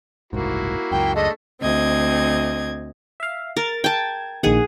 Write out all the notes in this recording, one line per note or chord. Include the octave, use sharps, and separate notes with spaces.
F#1 C2 G#2 A#3 E4 F#4
C#2 F#2 G5
G#3 A3 D4 D#5
D2 C4 D#5 G#6
E5 F5
A#4 A6
G5 A5 G#6
A#1 D#3 G#4 F#5